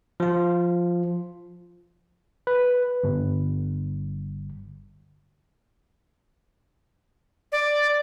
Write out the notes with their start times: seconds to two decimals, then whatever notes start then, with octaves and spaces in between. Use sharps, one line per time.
0.20 F3 F4
2.47 B4
3.04 G1
7.52 D5